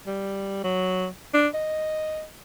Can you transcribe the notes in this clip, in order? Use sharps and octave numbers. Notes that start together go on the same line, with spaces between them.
G3
F#3
D4
D#5